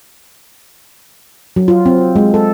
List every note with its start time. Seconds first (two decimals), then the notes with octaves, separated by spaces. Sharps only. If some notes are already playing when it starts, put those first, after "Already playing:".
1.56 F#3
1.68 F4
1.86 C4
2.16 G#3
2.34 A4